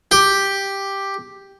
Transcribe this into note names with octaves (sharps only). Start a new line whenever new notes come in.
G4